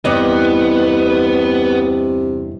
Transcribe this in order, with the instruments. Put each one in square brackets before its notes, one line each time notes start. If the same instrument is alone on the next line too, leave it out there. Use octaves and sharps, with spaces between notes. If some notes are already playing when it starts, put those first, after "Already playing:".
[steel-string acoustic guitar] E2 G2 [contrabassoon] C3 [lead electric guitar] B3 [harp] D#5